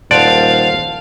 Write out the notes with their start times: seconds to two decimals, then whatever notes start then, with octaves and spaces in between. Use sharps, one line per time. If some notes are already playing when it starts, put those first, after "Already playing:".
0.11 D#1 C5 D5 F5 F#5 A5